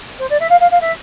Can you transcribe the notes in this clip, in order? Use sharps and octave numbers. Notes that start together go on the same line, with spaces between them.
C5
D5
E5
F5
F5
F5
E5